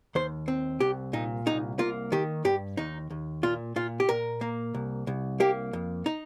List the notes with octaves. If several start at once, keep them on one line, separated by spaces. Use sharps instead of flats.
D#2 C5
C4
C2 G4
A#2 D#4
C2 D#4
A#3 F4
D#3 G4
G2 G4
D#2 D#4
D#2
A#2 F4
A#2 F4
G4
A#2 A#4
A#3
C2
C2
A#3 G4
F2
D#4